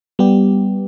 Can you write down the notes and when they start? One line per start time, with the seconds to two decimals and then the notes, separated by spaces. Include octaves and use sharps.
0.19 G3 B3 G4